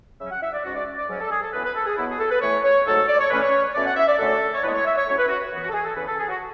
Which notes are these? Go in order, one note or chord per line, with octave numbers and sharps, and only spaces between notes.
C#3 F#3 C#4 E5
F#5
E5
D5
G#2 G#3 C#4 F#4
D5
D5
G#2 F#3 C#4
A4
G#4
A4
F#2 E3 B3 B4
B4
A4
G#4
B2 F#3 B3 E4
G#4
A4
B4
A2 E3 A3 C#5
C#5
G#2 F#3 A3 A4
D5
C#5
A2 E3 A3 C#4 B4
C#5
B2 A3 C#4 D5
F#5
E5
D5
F#2 D3 A3 C#4 A4
C#5
A2 G#3 B3 B4
C#5
E5
C#5
A2 F#3 C#4 C#5
B4
F#4
F#2 E3 B3 F#4
F#4
A4
G#4
A4
E2 C#3 E3 B4
A4
G#4
F#4